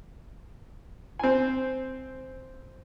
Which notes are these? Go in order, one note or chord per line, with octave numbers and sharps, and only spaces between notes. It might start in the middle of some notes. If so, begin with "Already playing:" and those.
C4 G#5